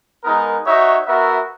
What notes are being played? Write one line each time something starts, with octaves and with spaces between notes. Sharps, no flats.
G#3 B3 D#4 A#4
D#4 F#4 C#5 E5
B3 F#4 A#4 E5